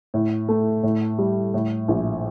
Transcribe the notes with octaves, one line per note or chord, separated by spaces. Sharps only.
A2
A3
A2
G3
A2
A#1